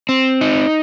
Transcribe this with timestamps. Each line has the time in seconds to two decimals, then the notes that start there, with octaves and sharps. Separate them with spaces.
0.09 C4
0.41 D#4